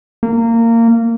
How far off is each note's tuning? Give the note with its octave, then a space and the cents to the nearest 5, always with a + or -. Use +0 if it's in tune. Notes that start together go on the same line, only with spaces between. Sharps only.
A#3 -20